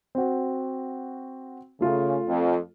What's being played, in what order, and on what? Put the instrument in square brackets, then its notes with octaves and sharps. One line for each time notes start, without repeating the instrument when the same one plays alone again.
[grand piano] C4 F#4
[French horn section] C#3 [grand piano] A3 F4
[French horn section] F2